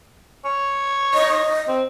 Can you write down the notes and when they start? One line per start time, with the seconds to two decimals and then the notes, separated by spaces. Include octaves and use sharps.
0.45 C#5
1.14 D#5
1.68 C4